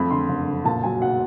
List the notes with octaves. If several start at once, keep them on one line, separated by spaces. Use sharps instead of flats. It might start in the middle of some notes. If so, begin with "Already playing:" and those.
Already playing: F2 A3 B5
D3 C6
F#1
F#1
A#2 A5
F#3 G#5
B1 F#5